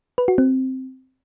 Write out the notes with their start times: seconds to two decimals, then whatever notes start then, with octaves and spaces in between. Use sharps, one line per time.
0.18 B4
0.28 F#4
0.38 C4